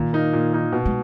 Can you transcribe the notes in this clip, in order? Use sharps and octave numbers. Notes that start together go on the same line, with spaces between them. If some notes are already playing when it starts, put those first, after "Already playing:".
Already playing: A#2 D#3
A#3 D#4
A#2
A#3 D#4
B2
G#3